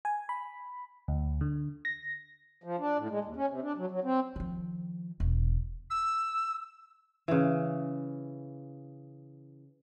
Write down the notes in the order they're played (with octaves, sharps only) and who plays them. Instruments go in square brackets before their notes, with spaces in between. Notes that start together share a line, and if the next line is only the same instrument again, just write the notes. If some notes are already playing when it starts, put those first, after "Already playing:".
[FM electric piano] G#5
B5
D2
D3
A#6
[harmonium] F3
D4
A2
G#3
D#2
C#4
C3
D4
F#3
F#3
C4
[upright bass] D#3 F3
E1
[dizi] E6
[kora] C#3 E3